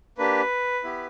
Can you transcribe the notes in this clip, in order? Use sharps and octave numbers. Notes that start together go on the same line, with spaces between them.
A#3 D4 G4 B4
B3 E4 G4